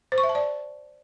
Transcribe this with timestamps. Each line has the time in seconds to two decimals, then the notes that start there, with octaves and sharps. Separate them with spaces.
0.12 C5
0.18 C#6
0.24 E5
0.29 A5
0.35 D5